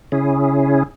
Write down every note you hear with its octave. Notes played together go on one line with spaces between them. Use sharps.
C#3 C#4 E4 G#4